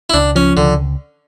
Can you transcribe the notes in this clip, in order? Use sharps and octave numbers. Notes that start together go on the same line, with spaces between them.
E4
C#2 D4
F3 C#4
C#2 D3